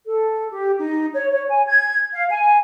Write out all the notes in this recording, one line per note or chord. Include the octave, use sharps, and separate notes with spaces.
A4
G4
D#4
C#5
C#5
G#5
G#6
F5
G#5